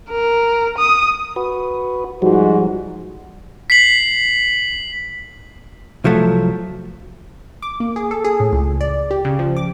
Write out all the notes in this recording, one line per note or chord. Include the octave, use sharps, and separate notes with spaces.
A#4
D#6
F#4 B4
G#2 F3 G3 F#4
B6 C7 F#7
C2 F3 F#3 A3
D6
A#3
G#4
A4
G#4
A2
C#2
D5
G4
C#3
F3
D6